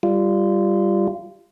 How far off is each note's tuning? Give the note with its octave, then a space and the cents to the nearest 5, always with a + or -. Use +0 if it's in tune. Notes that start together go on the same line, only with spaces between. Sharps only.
G3 +0 F4 -20